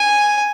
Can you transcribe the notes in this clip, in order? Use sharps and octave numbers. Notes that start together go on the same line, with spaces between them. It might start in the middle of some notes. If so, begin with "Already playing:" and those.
Already playing: G#5